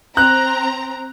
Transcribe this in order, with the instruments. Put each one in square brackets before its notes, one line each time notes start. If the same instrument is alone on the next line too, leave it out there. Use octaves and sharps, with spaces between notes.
[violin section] C4 A#5 [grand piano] F#6